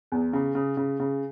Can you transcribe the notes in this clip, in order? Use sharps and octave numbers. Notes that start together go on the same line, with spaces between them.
E2
C#3
C#3
C#3
C#3